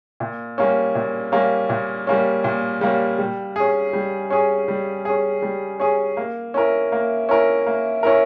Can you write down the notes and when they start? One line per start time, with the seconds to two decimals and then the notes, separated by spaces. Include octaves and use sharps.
0.20 A#2
0.58 G3 A#3 C#4
0.95 A#2
1.32 G3 A#3 C#4
1.69 A#2
2.07 G3 A#3 C#4
2.44 A#2
2.81 G3 A#3 C#4
3.19 G3
3.56 C#4 G#4
3.93 G3
4.30 C#4 G#4
4.68 G3
5.05 C#4 G#4
5.42 G3
5.80 C#4 G#4
6.17 A#3
6.54 C#4 E4 A#4
6.92 A#3
7.29 C#4 E4 A#4
7.66 A#3
8.03 C#4 E4 A#4